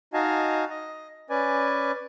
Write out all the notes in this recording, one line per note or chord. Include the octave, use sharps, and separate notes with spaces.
D#4 F#4 D#5 F5 G#5 A5
D#5
C#4 B4 D5 G#5